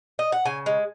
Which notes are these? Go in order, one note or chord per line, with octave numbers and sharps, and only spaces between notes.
D#5
F#5
C#3 G#5
G#3